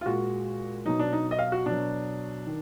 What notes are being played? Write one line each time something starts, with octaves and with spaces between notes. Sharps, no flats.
F4
A#2 G#3 F#4
B2 F#3 D#4
D4
D#4
D#5
F5
F#4
B2 F#3 D4
D#3